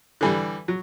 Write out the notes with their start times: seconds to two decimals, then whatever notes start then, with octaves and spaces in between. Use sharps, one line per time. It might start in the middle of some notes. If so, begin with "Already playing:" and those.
0.21 D3 E3 G3
0.68 F#3